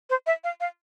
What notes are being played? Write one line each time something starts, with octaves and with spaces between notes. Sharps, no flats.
C5
E5
F5
F5